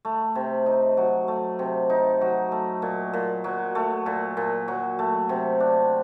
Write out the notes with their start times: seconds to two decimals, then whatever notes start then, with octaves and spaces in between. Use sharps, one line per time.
0.05 A3
0.35 C3
0.66 D#4
0.97 F#3
1.28 A3
1.59 C3
1.90 D#4
2.21 F#3
2.52 A3
2.82 A#2
3.13 A#2
3.44 F#3
3.75 A3
4.06 A#2
4.37 A#2
4.68 F#3
4.99 A3
5.29 C3
5.60 D4